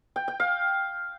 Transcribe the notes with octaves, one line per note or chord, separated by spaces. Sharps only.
G5
G5
F5